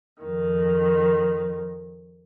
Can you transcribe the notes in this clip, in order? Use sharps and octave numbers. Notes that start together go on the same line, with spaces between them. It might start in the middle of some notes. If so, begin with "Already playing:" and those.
F2 D#3